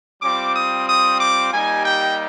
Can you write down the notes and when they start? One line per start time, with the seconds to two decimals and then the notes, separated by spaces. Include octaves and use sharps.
0.22 G3 C4 F4 D6
0.55 D#6
0.88 D#6
1.20 D6
1.52 G3 A#3 D#4 G4 G#5
1.85 G5